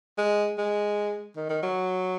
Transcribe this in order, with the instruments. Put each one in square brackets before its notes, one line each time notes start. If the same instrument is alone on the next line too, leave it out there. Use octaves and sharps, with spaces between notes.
[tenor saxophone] G#3
G#3
D#3
D#3
F#3